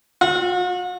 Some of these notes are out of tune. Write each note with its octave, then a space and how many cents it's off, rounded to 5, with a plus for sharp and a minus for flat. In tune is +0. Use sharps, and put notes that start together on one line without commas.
F#4 -45